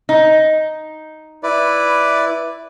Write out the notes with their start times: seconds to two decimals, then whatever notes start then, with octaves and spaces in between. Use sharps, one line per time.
0.09 D#4
1.43 E4 B4 D5